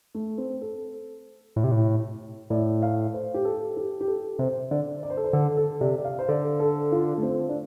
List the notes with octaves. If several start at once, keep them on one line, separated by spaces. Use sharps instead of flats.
A3
C4
A4
A2
C3
A2
A2 D5
F5
C5
G4
A4
G4
G4
A4
C3 C5
D3 D5
D5
C5
A4
C5
D3 A4
A4
C3 D5
D5
F5
C5
D3 D5
A4
F4
A3
C4
D4